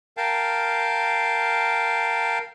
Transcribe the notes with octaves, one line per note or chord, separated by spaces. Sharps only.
A#4 F5 G5 A5